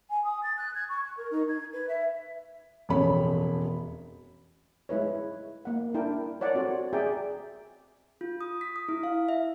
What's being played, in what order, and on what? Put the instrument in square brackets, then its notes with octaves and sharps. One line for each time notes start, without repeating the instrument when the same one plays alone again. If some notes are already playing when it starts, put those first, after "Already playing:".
[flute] G#5
D#6
A6
F#6
G#6
C#6
C#6
A#4
D#4
G#6
B4
E5
[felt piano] E1 A1 F2 C#5 B5
[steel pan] G#3 E4 B4 C#5
A#3 F#5
D4 E4 A#4 G5
A#4 C#5 D5 F#5
C4 F#4 A4 C5
G#4 D5 E5 G5 G#5 A#5
[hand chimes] F4
D#6
B6
D#6
E4
F5
E5